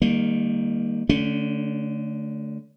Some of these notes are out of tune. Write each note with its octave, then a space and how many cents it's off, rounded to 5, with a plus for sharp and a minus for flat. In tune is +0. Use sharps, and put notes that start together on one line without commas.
D#3 +0 G3 +35 A#3 +0
D3 +0 A3 +0 C#4 +25